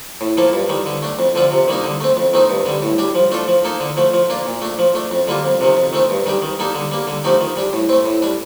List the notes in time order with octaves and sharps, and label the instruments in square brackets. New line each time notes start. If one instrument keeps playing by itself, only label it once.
[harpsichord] A2
F3 A#3 F4 A4
G2
D#3 G3
D3
A3 D4
F2
D3 F3 C4 F4
C3
D#3 G3 A#3 D#4
D3
A3 C4
F2
D#3 A3 C4 D#4
G2
D3 G3
A2
G3 D4 G4
F3
A3 D4 F4 A4
F3
A#3 D#4 A4
D3
F3 A3
F3
A#3 D4 F4
A#2
A3 D4
F3
A3 D4
F2
D3 G3 A#3 F4
F2
C3 D#3
F2
D#3 A3 C4
G2
D#3 G3 D4 G4
D#3
G3 A#3 D#4 A4
D3
G3 A#3
D3
F3 A3 D#4 G4
D#3
G3 D4 G4
A2
A3 C4
A2
G3 D4